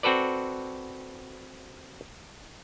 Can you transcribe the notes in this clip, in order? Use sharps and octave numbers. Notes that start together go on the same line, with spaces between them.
C4 F#4 A4 B4 D5